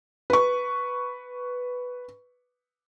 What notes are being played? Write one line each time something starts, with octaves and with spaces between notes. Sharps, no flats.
B4 C#6